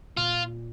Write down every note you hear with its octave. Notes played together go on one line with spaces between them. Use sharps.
A#2 F4